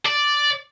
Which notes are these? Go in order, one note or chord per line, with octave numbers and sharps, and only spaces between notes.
D5